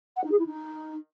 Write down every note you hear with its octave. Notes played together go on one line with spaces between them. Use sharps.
F#5
D#4
G#4
E4
D#4